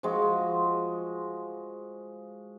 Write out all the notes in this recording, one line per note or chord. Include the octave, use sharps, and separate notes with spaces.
F3 G#3 F#4